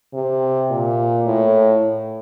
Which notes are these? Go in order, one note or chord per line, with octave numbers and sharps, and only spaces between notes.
C3
A#2
A2